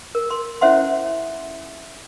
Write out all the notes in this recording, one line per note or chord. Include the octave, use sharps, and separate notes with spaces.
A#4
C6
C#4 E4 C5 E5 F#5 C6